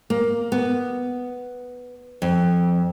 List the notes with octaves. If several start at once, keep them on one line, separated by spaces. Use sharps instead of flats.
A#3
B3
F2